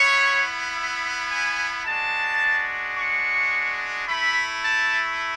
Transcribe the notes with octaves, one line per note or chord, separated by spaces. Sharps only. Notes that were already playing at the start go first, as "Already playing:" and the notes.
Already playing: B3 E4 C#5
E5
G#5
G#3 D4 F#4 A5
C#6
A3 E4 B5
A5